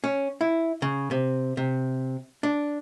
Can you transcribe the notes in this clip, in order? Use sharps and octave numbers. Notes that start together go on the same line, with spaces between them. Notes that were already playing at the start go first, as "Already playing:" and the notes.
C#4
E4
C#3
C3
C3
D4